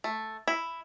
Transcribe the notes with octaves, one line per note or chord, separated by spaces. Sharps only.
A3
E4